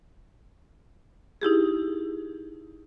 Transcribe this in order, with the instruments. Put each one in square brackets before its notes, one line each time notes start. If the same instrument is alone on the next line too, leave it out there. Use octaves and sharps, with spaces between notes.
[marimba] D#4 E4 G4 G#4